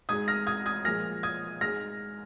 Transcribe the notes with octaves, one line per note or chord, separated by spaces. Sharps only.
G#2 G#3 D#6 G#6
F6 A#6
D#6 G#6
D#6 G#6
A#2 F3 G#3 F6 A#6
D#6 G#6
G#2 G#3 F6 A#6